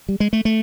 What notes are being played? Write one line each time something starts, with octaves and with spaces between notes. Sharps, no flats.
G3
G#3
A3
A3